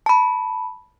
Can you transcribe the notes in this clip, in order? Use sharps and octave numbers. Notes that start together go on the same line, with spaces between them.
A5 B5